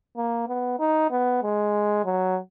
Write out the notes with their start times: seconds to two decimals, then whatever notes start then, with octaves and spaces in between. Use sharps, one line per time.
0.17 A#3
0.48 B3
0.79 D#4
1.11 B3
1.43 G#3
2.05 F#3